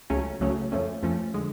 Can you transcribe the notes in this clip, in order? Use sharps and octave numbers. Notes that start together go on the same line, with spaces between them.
C#2 C#3 F#3 A3 C#4
C#2 C#3 F#3 A3 C#4
F2 F3 A3 C#4
F2 F3 A3 C#4
D3 G#3